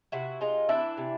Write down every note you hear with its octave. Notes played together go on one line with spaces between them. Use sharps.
C3 E4 F#4
G#3 D#4 F4
E3 D4 E4
C3